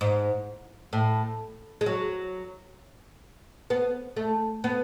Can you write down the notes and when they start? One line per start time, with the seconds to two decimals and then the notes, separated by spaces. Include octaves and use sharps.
0.01 G#2
0.93 A2
1.81 G#3
1.86 F#3
3.70 B3
4.16 A3
4.64 B3